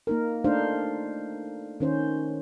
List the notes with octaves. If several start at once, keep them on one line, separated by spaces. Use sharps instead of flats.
A#3 D#4 A#4
A3 D4 D#4 C5 F5
D#3 C#4 C5